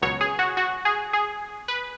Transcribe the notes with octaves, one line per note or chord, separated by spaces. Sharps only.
C#2 B2 F#3 C#5
G#4
F#4
F#4
G#4
G#4
B4